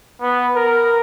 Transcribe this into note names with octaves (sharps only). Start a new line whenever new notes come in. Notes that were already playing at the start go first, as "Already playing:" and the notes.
B3
A#4